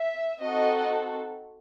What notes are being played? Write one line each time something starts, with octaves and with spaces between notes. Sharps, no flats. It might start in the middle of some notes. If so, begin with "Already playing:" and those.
Already playing: E5
C4 D#4 F#4 A4 D#5